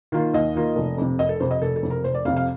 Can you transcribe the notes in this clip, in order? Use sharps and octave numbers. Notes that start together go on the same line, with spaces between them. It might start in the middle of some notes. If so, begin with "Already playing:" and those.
D#3 A#3 F4
D#2 D#5
D#3 A#3 F4
F1
F2 C3
F1 D#5
A4
F2 C3 C5
D#5
F1 A4
A4
F2 C3
A#4
F1 C5
D5
F2 C3 F5
F5